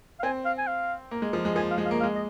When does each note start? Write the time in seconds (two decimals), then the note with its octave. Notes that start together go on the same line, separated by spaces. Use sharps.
0.19 F5
0.23 C4 G#5
0.45 F5
0.58 G#5
0.67 F5
1.11 A#3
1.22 G#3
1.33 F3
1.45 G#3
1.56 F3 G#5
1.71 F5
1.78 G#3
1.85 F5
1.91 A#3
2.00 F5
2.03 G#3
2.15 D#5